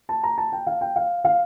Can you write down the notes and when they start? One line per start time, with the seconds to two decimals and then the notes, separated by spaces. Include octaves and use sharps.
0.09 A5
0.23 A#5
0.38 A5
0.52 G5
0.67 F5
0.81 G5
0.96 F5
1.24 F5